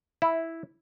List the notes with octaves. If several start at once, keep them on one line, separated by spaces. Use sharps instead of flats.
E4